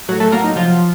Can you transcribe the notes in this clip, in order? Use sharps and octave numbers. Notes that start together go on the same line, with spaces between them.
A2 F#3 F#4
A3 A4
F#3 A#3 A#4
D#4
C3 F3 F4